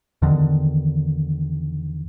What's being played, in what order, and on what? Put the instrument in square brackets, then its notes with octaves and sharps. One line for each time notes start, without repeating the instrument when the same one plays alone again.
[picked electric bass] E2 D3 D#3